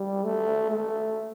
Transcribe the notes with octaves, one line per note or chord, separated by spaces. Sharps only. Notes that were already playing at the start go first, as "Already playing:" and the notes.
Already playing: G3
A3
A3